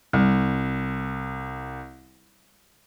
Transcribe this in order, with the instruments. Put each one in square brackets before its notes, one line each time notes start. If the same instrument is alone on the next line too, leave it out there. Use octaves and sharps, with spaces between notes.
[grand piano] C2 [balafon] G3